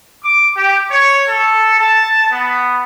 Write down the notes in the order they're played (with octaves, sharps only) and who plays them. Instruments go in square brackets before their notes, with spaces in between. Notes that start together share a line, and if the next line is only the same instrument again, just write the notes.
[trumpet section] D6
G4
C#5
A4
A5
B3